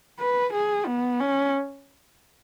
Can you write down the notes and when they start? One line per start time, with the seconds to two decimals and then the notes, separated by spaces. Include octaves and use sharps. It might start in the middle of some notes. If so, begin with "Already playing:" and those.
0.19 B4
0.53 G#4
0.86 B3
1.20 C#4